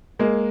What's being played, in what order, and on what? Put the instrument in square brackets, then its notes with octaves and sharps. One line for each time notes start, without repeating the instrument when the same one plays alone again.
[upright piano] G#3 A#3